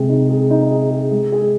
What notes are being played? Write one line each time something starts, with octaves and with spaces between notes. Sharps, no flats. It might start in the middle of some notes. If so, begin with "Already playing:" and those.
Already playing: C3 G#3 G#4
D#4
G#4
D#4
G#4
G#4
G#3
G#4